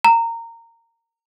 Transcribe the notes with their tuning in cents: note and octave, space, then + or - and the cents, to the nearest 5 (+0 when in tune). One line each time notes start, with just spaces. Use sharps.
A#5 -20